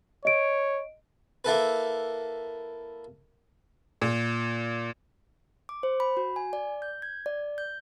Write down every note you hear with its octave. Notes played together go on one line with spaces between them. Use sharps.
C#5 D#5 D7
A#3 E4 A4 B4
A#2
D6
C5
B5
F#4
G#5
D5
G6
G#6
D5
G6